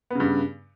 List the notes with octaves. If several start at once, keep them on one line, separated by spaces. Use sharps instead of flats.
G2 C#3 B3